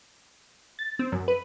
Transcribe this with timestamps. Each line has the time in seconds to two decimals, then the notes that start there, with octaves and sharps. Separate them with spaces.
0.79 A6
0.99 C4
1.12 F#2
1.28 B4